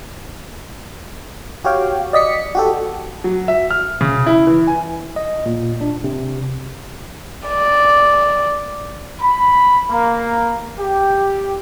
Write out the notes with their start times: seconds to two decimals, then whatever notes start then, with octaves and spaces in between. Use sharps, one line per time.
1.64 F#4 G4 C#5 F5 G5
2.13 D5 D#5 B6 C#7
2.55 F#4 G4 A4
3.24 F#3
3.48 E5
3.71 F6
4.01 C#3
4.26 E4
4.47 E3
4.67 G#5
5.16 D#5
5.46 A#2
5.81 D4
6.04 C3
7.48 D5
9.20 B5
9.89 A#3
10.79 G4